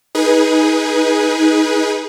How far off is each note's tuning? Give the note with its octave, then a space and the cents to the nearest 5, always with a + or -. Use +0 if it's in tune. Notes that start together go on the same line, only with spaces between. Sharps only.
D#4 +20 G#4 +0 B4 -20